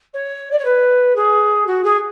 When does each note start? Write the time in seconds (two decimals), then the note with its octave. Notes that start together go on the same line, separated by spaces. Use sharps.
0.13 C#5
0.51 D5
0.58 C#5
0.64 B4
1.15 G#4
1.66 F#4
1.84 G#4